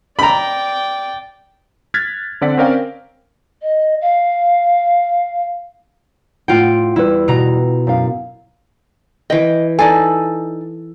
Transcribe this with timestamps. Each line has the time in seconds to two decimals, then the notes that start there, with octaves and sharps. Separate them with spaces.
0.19 D5 G5 A#5 B5
1.94 F6 F#6 G#6 A6 B6
2.41 D3 C4 D5 F#5 B6
2.57 C4 C#4 A#4 D5 F5 G5
3.62 D#5
4.01 F5
6.48 A2 F4 F#5 G5
6.96 E2 G3 E4 B4
7.28 B2 A#5
7.87 F#2 F5
9.30 E3 D#5 G5
9.79 D#4 A4 D5 G#5